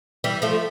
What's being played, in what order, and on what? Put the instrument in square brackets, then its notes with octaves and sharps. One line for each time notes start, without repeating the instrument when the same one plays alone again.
[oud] E3 G3
F3 A3